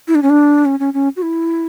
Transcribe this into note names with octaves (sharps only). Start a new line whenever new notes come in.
E4
D4
C#4
D4
C#4
C#4
C#4
F#4
E4